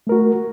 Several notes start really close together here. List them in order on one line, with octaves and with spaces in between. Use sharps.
A3 A#4 F#4